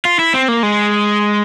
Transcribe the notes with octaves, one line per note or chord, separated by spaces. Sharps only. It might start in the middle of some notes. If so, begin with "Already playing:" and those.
F4
E4
C4
A#3
G#3